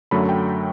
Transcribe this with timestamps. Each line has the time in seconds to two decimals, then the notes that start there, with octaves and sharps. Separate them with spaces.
0.11 F#2 D3 F#3 A3 B5
0.29 G5